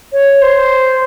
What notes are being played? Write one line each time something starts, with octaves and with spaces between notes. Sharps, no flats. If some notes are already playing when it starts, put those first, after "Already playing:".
C#5
C5